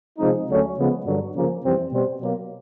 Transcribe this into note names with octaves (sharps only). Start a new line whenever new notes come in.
C3 F3 G#3 C4 D#4
D2 D3 F#3 A3 C#4
C#3 F3 G#3 B3
G2 D3 F#3
C#3 F3 A#3
F2 C3 E3 G3 C4
B2 G3 C4
B2 F#3 A#3